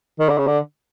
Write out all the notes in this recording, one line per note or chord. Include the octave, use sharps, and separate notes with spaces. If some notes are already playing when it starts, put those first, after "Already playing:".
D#3
D3
C#3
D3